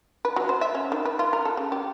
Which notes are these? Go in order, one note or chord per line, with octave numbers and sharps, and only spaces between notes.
B4
F#3
C5
E5
C#4
D#3
B4
F4
A#4
A4
C#3
G4